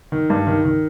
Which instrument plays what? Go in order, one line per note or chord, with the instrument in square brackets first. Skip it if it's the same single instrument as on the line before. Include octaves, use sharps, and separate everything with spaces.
[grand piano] D#3
G2
D#3
D#3